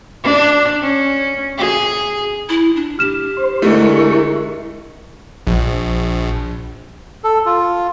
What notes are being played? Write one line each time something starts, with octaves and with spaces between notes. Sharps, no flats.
D4
C#4
G#4
E4
D4
G4 F6 E7
C5
D3 G#3 A3 E4 A#4 C#6
A#1
A4
F4